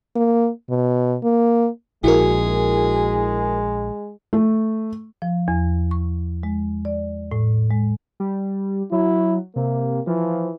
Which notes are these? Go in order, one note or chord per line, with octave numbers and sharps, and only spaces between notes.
A#3
B2
A#3
A#1 G#3 E4 F#4 G#4 A#4
A3
F3
E2
C#6
G#3
D5
A2
G#3
G3
F#3 E4
C3 A#3
E3 F3